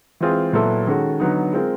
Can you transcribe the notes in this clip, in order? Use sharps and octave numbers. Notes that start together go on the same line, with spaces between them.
E3 G#3 C4 F4 G#4
A#2 F#3 B3 E4 A4
D#3 G#3 C#4 F#4 A4
D3 F#3 B3 D#4
G#3 C4 F4 A#4